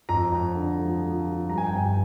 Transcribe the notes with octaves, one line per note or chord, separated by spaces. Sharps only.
F2 A#5
F2
D3
F3
F3
F3
G2 A#5
G#5
G5
G1 G#5